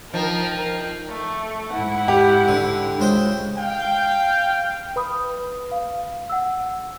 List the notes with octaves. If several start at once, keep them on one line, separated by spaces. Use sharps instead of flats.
F3 D#4 A#4 G5
A3
G#2 E4 F#5
G4
D3
C#2 C5 G5
F5 G5
B4 B5 D#6
F5
F#5 E6